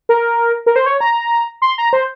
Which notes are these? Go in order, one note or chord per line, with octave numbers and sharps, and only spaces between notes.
A#4
A#4
C5
C#5
A#5
C6
A#5
C5